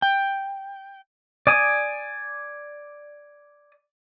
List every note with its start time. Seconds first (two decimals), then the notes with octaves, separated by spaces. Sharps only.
0.02 G5
1.47 D5 G#5 D#6